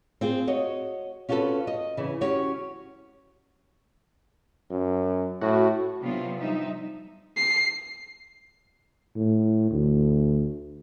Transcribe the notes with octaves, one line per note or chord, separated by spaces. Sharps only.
C4 F4 G#4 C5
F#4 C#5 D#5
C#4 F4 F#4 G#4 A4 B4
D#5
C#3 E3
C#4 F#4 G4 C#5
F#2
A2 F#4
C3 F3 F#3 B3 D4 F4
F3 G3 D#4 E5
C7
A2
D2